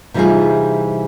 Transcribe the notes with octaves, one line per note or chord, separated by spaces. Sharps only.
C3 E3 G3 D#4 F4 G#4